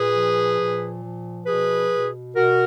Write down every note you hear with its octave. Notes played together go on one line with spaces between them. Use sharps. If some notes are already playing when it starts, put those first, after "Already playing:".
Already playing: A#2 G#4 B4
F3
A#2
F3
B2 G#4 B4
B2
B2 F#4 A#4